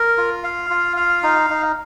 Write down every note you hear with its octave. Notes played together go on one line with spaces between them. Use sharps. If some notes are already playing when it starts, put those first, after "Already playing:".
Already playing: A#4
F4
F5
F4
F5
D#4
D#4